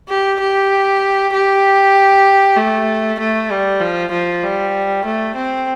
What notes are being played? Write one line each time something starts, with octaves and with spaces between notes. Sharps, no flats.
G4
G4
G4
A3
A3
G3
F3
F3
G3
A3
C4